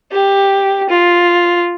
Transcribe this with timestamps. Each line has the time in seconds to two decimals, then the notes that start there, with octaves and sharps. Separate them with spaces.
0.12 G4
0.89 F4